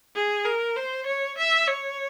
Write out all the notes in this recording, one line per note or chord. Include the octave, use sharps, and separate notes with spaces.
G#4
A#4
C5
C#5
E5
C#5